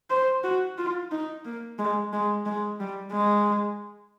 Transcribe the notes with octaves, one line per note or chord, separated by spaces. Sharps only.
C5
F#4
F4
D#4
A#3
G#3
G#3
G#3
G3
G#3